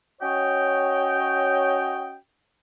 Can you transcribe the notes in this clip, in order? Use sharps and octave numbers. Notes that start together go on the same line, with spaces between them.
C#4 F#4 C#5 D#5 G5